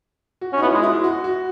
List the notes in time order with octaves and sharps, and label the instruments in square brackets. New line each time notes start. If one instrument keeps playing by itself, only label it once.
[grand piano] F#4
[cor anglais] C#4
[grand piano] D#4
[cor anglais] B3 [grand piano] E4
[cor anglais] G#3 [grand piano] F#4
[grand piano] E4
F#4
F#4